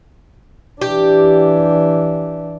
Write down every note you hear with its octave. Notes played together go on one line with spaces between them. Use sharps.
E3 D4 G4